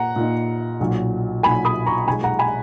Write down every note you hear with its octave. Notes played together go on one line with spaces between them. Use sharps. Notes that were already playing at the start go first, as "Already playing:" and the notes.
Already playing: A#2 A#3 F#5 A#5
A#2 A#3 D#4
B1 A#2 F#3
B1 A#2 F#3 G#5 B5
B5 D#6
A#5 C#6
B1 A#2 G#3 G#5 B5
F#5 A#5
G#5 B5